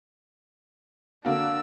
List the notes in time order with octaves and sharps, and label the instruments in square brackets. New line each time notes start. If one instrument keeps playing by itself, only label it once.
[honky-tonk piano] D3 A#3 F#4 [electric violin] D4 E6